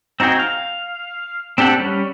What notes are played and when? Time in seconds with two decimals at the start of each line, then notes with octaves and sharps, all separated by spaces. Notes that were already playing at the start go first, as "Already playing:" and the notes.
0.20 C4 D#4 F#4 G#4 G5
0.39 F5
1.58 C4 D4 G4 A4 F#5
1.80 G3 C#4